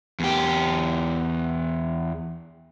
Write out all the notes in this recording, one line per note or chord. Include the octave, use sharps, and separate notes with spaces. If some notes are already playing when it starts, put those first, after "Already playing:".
E2 G4